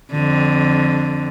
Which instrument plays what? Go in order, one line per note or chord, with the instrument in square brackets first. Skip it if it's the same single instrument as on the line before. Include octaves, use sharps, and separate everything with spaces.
[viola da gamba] F2 D3